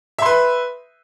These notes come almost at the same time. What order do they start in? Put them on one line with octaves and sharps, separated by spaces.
E5 C6 B4